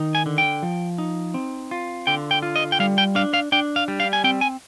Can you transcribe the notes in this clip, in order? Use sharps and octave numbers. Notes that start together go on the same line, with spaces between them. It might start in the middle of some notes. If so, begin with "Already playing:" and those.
Already playing: D#3 D#4
G#5
D3
G5
F3
D#4
C4
F4
D3 G5
G5
F4
D#5
G5
G3 F5
G5
D4 F5
F5
D4 G5
F5
G3
F5
G#5
C4 G5
G#5